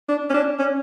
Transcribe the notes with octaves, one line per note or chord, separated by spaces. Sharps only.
D4
C#4
D4
C#4